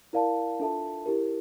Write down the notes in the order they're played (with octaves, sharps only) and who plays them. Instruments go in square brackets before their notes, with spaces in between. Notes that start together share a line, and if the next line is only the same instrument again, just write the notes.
[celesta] E4 A#4 D5 F5 A5
D4 F4 A4 E5 A5
E4 G4 A#4